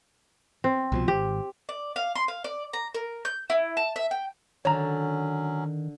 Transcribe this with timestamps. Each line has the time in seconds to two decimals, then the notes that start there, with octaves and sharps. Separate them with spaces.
0.64 C4
0.92 C2 B2 F3
1.08 G#1 G4
1.69 D5
1.96 F5
2.16 C6
2.28 F5
2.44 D5
2.73 A#5
2.94 A#4
3.25 G6
3.50 E4
3.77 A5
3.96 E5
4.11 G5
4.65 D3 D#3 F#3 C#4 C#5 A#5